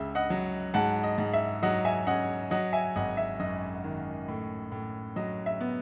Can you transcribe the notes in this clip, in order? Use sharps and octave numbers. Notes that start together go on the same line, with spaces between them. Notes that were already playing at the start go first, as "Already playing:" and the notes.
Already playing: C#2 C#3 E5
D#5 F#5
F#3
G#2 F#5 A5
D#5
G#2
E5
F#3 D#5 F#5
E5 G#5
C#4 D#5 F#5
F#3 D#5 F#5
E5 G#5
G#1 D#5 F#5
E5
F#2 D#5
D#3
A2
A2
F#3 D#5
E5
B3